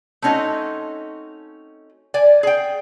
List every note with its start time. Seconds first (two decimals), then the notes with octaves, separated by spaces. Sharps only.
0.22 A3 C4 C#4 D#4 F#4
2.14 D5 G#5
2.43 G#4 G5